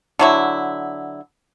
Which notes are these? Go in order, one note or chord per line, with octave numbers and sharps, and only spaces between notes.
D3 F#3 E4